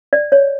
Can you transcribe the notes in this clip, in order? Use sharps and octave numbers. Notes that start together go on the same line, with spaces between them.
D5
C#5